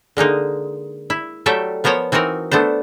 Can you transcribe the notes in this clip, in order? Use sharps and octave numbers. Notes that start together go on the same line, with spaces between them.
D3 G#3 A#3 D#4
E4
F#3 G3 A3 A4 E5 G5
F3 B3 A#4 C5 C#5
E3 C4 D#4 F#4 A#4
A3 B3 D4 C5